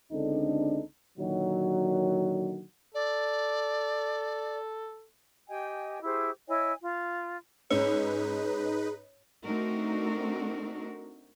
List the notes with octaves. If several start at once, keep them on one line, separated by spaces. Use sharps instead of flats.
C#2 D3 C4 D4 D#4 A4
A#2 D3 D#3 F#3
A4 D5
G4 D#5 G5 G#5
E4 G4 G#4 C5
E4 C#5 D#5 G#5
F4
G#2 C#4 D#4 G#4 B4 C#5 E6
A3 C4 D4 D#4 F#4 A#4